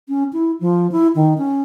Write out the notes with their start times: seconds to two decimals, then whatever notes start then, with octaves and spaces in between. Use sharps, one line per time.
0.09 C#4
0.33 E4
0.61 F3
0.92 E4
1.15 D#3
1.38 C#4